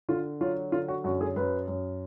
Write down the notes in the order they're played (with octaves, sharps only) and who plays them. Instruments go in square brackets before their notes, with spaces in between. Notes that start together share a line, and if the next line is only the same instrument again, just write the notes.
[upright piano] D3 F4
F#3 F4
D3 F4
F#4
F#2 F#4
G#4
F#2 B4
F#2